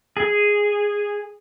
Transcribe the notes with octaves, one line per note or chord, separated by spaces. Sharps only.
G#4